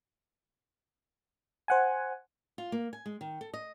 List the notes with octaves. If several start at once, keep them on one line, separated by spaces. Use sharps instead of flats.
C5 F#5 G#5
F4
A#3
G#5
G#3
D#3
A4
D#5